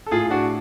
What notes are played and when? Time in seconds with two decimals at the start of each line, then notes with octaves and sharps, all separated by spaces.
0.06 A4
0.11 A2 F4 G#4
0.30 D4 F#4